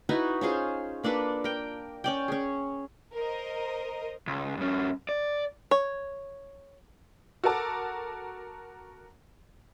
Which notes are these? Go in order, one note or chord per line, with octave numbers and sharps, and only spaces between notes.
D#4 E4 F#4 B4
C#4 F4 G#4 C5
A#3 D4 A4 B4
A#4 G5
C#4 D5 G5
C#4 G#4
A#4 C5 D#5
C#2
G2 C#4
D5
C#5
F#4 A4 A#4 A5 D6